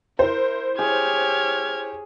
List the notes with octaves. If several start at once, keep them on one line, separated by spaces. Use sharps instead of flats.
E4 A#4 C5
G4 G#4 C#5 F6 G#6